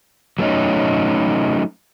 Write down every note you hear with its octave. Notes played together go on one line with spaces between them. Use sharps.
F#3 A3 C#4 D#4